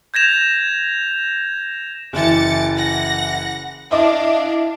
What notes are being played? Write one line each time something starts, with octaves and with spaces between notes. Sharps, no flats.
G6 G#6 A#6 E7 F7
F#1 E3 D6 A6 C#7
F#5 A#6
D4 E4 D#5 F5 D6